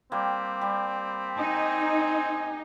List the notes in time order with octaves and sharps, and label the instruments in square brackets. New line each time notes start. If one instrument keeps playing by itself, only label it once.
[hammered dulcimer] G3 A#3 [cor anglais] C4
[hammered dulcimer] G3
[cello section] D#4 [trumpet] G#5